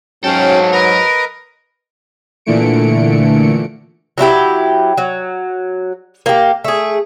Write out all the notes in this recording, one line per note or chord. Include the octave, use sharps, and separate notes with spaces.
G#2 F#3 C#4 A4 F5 G5
A#4 B4 D#5 A#5
A#2 D3 E3 A3 C#7 D7
F#3 D4 E4 G4
F#3
A#3 G4
A3 G#4